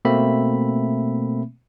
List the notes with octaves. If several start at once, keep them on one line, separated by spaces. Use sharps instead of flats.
B2 A3 A#3 C4 E5 B5